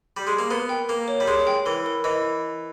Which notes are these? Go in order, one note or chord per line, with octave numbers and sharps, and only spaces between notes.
G3
G#3
A#3
B3 A#4
G5
A#3 A#4
C#5
G3
G#3 C#5
G5
E3 A#4
A#4
E3 D#5